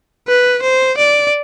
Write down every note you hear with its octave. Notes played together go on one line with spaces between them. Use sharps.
B4
C5
D5